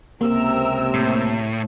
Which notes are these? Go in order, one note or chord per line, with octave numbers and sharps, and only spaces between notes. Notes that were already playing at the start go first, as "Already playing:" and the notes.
C#2 C3 A#3 A#4 E6
A2